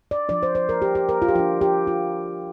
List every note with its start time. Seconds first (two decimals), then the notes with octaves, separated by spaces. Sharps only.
0.11 D5
0.29 F3 D4 D5
0.43 C5
0.55 C5
0.69 A#4
0.82 G4
0.95 G4
1.09 A#4
1.22 F4
1.28 G4
1.35 F3 D4 F4
1.61 G4
1.87 F4